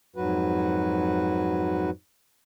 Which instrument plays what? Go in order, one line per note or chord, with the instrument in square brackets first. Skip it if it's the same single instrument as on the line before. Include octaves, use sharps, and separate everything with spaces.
[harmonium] F2 G#2 F#3 F#4 B4